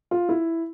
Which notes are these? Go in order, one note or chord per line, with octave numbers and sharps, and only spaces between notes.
F4
E4